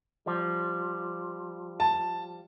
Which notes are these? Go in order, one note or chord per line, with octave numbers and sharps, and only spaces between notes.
F3 G3
A5